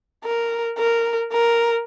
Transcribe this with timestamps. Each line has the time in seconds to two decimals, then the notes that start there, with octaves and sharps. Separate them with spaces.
0.24 A#4
0.78 A#4
1.33 A#4